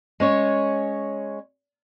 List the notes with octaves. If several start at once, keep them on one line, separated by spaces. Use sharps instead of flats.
G#3 C#4 C#5